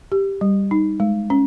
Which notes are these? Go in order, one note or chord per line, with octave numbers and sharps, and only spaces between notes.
G4
G3
D#4
G#3
C#4